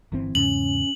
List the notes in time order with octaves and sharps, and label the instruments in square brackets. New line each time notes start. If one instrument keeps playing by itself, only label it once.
[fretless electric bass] G1 E3 C4
[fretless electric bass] E2 G#2 C#3 [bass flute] C#4 [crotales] F#7